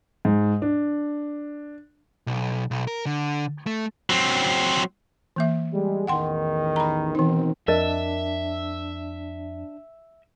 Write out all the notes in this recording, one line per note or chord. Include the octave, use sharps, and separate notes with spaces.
G#2
D4
B1
B1
A#4
D3
A3
F#3 C4
E3 A#3 E5
G3 G#3
A1 E2 D#3 F#5 G5 C6
A#5 B5
B2 D#3 E3 C4 D#4
F2 D4 A#4 D#5 E5